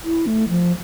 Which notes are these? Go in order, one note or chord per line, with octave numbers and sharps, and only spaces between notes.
E4
A3
F3